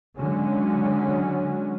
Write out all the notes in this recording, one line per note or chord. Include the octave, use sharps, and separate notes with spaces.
D3 F#3 G#3 C#4